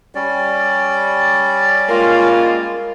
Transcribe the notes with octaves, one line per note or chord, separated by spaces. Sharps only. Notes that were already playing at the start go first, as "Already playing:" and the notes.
G3 C#4 D5
G#3 A#3 F4